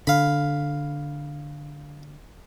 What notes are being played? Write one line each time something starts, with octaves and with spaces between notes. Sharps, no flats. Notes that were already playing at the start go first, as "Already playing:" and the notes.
D3 F5 B5